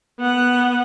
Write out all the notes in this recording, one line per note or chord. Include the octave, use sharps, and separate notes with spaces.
B3 F#5